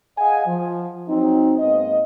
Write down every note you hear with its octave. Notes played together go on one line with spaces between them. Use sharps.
G#4 D#5 F5 F#5 G#5
F3
F#3 C4 D#4
G#2 A#3 B3 D#5